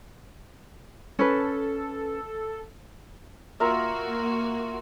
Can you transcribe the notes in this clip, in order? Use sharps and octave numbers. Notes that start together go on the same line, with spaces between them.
C#4 A4 B4
A#3 F4 F#4 A#4 E5